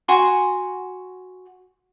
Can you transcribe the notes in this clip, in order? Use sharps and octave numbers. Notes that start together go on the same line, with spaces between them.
F#4 G#5 C6